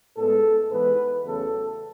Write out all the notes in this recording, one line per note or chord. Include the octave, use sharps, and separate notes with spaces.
A2 G#3 B3 A4
G#2 E3 B3 B4
E2 C#3 F#3 A3 A4